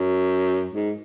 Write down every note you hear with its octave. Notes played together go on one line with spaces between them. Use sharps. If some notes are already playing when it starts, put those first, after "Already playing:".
Already playing: F#2
G#2